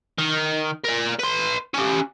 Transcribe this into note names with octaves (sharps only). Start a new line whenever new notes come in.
D#3
A#4 D5
B4 C6
C#4 G4